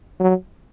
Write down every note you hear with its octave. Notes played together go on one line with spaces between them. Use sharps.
F#3